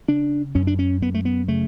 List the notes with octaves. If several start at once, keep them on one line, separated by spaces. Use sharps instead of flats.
C#3 D4
F#2 C#4
D4
C#4
F#2 B3
A3
B3
C#3 A3